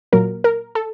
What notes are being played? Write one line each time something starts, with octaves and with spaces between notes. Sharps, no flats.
A#2 F#3 A#3 A#4
A#4
A4